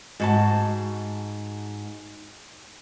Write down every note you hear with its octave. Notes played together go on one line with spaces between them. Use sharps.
G#2 F#4 A5